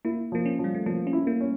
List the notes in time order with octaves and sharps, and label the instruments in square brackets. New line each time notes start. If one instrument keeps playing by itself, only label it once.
[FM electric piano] A#3 [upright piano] E4
[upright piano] F3 [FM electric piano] A#3
[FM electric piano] C#4
[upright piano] F3
[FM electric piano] G3
A3
[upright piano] F3 [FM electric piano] A#3
[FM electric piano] C#4
[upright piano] E4
[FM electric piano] A#3
[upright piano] C#4